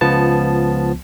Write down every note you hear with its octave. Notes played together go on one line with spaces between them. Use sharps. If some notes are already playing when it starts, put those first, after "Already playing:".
C#2 F3 B3 A5